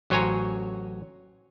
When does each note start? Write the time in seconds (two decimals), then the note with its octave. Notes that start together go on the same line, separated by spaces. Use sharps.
0.10 A1 F#3 C5 C#5 G#5 A#5